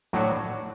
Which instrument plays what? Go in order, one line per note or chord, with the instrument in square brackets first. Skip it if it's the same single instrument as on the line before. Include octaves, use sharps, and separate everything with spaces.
[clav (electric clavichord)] A2 F#3 A3 D4 F#4